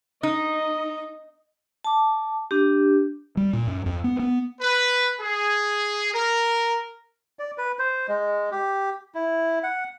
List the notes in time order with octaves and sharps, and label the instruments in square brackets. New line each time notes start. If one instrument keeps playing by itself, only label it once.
[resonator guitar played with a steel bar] D#4 [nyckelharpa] D#5
[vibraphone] A5 D6
D4 G4
[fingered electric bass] G3
A#2
F#2
F2
B3
B3
[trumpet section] B4
G#4
A#4
[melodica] D5
B4
C5
G#3
G4
E4
F#5